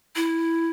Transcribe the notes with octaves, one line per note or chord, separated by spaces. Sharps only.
E4